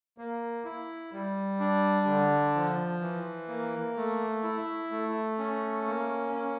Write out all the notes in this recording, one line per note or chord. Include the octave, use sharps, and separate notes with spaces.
A#3
E4
G3
D4
D3
F3
E3
A#3
A3
E4
A3
C#4
A#3
C#4